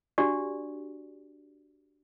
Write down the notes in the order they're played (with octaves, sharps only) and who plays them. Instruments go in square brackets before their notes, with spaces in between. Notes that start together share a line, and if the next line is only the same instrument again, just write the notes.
[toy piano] D4 F#4 G4 D5